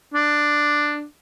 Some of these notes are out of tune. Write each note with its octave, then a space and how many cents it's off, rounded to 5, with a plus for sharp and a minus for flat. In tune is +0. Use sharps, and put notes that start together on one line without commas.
D4 +5